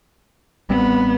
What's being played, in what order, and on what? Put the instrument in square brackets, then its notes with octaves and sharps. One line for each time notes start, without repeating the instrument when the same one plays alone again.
[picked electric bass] A1 G3 C4 [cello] B3